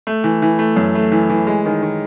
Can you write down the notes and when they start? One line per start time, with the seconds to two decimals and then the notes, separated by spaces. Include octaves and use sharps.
0.07 A3
0.24 E3
0.42 E3
0.59 A3
0.76 F#2
0.95 A3
1.12 E3
1.30 E3
1.47 G#3
1.66 D#3
1.82 D#3